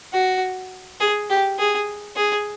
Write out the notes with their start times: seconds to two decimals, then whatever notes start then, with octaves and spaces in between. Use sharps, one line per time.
0.13 F#4
1.00 G#4
1.30 G4
1.59 G#4
2.16 G#4